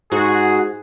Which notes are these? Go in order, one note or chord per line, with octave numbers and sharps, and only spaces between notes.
G#2 F#4 G#4